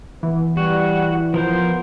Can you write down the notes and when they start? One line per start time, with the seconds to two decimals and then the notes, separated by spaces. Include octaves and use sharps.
0.23 E3 B3
0.57 G3 F#4
1.34 F3 B3 A#4 C5